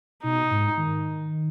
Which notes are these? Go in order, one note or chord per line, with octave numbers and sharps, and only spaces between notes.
B2 D#4
G#2
D#3